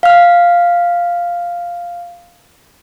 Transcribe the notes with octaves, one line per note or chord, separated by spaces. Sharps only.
F5 F6